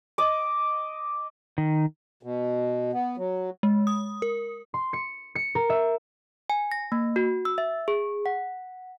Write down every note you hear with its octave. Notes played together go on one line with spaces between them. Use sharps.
D#5 D6
D#3
B2
B3
F#3
G#3
D#6
A#4
C6
C#7
C#7
A#4
E5
G#5
A#6
A#3
F#4
E6
E5
G#4
F#5